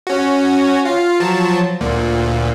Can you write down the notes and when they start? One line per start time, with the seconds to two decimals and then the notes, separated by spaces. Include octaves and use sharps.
0.07 C#4 F#4
0.85 F4 F5
1.20 F3 F#3 A5
1.81 D2 A#2